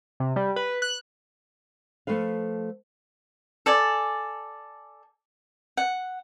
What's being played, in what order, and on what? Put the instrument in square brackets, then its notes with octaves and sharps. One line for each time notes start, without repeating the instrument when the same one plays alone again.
[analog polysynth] C3
G3
B4
F#6
[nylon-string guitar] F3 A3 A4 B4 F5
[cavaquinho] A4 D5 G#5
F#5